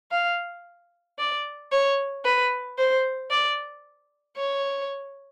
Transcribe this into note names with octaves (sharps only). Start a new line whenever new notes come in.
F5
D5
C#5
B4
C5
D5
C#5